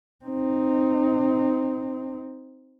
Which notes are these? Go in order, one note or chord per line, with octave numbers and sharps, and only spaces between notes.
C4 D#4